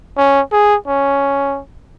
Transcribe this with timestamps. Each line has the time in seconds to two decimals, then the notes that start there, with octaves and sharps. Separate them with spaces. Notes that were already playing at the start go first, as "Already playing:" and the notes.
0.17 C#4
0.51 G#4
0.87 C#4